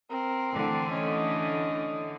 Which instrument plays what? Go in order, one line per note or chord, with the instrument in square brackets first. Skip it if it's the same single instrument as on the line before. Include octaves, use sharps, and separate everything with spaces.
[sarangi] C4 [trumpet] A#4
[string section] D3 E3 A3 [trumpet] D4
[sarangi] C#4 [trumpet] D#5